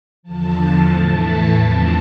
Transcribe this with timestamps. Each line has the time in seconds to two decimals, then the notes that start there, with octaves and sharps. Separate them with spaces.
0.23 E2 D3 F3 A5
0.90 A2 E3 A3
1.57 E2 D3 F3 C4 A5